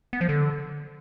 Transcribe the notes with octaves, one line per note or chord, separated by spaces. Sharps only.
B3
F3
D3